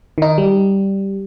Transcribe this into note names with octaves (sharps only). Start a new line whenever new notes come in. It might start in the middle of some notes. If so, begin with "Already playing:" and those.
D#3 D#4
G3